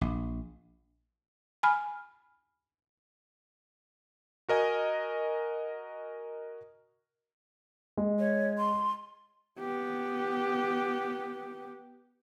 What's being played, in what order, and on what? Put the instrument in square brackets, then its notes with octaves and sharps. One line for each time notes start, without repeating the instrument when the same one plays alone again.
[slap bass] A#1
[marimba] G#5 B5 F6
[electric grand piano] F#4 A#4 D#5 G#5
[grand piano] G#3
[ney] C#5
C6
[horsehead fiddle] B3 G4